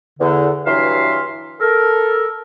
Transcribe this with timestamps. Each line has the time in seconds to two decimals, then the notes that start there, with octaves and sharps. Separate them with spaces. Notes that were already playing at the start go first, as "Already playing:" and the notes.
0.20 E2 D3
0.66 G2 E3 F#3 E5 F5 C6
1.61 A4 A#4